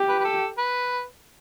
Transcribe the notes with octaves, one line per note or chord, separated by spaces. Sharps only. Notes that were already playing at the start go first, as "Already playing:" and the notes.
Already playing: G4
B4
B4
A4
B4